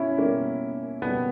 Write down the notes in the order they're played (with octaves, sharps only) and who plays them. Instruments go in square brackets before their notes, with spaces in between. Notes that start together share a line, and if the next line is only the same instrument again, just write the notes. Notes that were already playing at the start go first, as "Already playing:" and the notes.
Already playing: [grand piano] B2 C#4 E4
B2 G3 A#3 C#4
B2 G3 B3